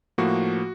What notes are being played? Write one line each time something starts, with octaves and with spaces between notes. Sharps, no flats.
A2 F3 A#3 F#4